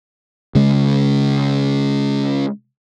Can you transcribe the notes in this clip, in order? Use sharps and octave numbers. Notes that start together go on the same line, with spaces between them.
C#3 G#3